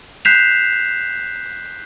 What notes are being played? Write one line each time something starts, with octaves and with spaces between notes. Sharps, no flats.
F#6 G6 B6 C7 E7 F7